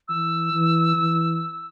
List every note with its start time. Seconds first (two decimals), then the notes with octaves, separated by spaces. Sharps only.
0.08 E3 E6
0.53 E3
0.97 E3